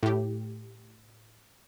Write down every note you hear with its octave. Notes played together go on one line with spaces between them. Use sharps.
A2 G4